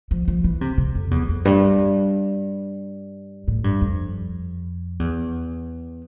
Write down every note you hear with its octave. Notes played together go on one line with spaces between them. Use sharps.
F3
F3
E3
C3
C3
F2
E2
F2
G2
A2
G2
F2
E2